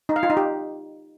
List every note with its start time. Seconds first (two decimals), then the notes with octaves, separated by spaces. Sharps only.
0.09 D#4
0.16 F5
0.23 F4
0.30 D#4
0.37 G4